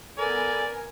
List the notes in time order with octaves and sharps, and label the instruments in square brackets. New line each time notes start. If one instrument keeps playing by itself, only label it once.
[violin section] B3 G#5 [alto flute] A4 [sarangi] A#4 [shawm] D5